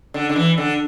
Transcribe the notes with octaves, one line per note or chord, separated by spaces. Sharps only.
D3
D3
E3
D3